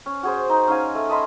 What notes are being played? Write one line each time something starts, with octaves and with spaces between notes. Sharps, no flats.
C#4
F#4 G#4 C5
D#4
C#4 D#4 F5 G#5
A3
D#5 A5 B5 C6